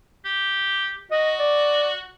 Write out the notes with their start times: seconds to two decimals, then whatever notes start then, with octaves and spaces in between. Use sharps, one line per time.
0.25 G4
1.11 F#4 D#5
1.40 D5